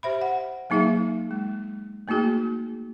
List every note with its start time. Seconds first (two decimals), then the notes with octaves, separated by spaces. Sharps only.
0.03 G4 C5 E5 B5
0.21 F#5
0.70 F#3 A#3 D#4 G#4 E5 F5
1.31 G#3
2.08 A3 A#3 D#4 F#4 G#4